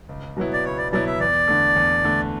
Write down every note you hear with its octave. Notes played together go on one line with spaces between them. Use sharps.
C#2
B2 F#3 B3 E4
D5
C#2 C#5
D5
B2 F#3 B3 E4 D5
E5
E2 D5
D3 A3
E2
D3 A3